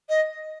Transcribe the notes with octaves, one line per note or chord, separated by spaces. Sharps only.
D#5